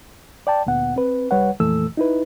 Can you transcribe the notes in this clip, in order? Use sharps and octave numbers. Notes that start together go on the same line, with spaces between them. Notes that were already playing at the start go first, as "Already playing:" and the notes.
D5 G5 A5
D2 A#2 B3 F#5
C4 B4
C2 G3 B4 C#5 F#5
F2 A#2 E3 A3 A4 E6
D#4 E4 B4